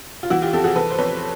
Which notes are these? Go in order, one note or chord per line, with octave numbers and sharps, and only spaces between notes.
F4
E3 E4 F#4
F4 G4
F2 G4 A4
F#4 G#4
E3 A4 B4
C5
F2 B4 C#5